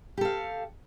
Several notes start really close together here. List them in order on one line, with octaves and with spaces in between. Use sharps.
G4 A4 F5